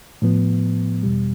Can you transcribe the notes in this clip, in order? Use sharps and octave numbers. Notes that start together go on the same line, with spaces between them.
A2 F3 B3
E2 B2 G3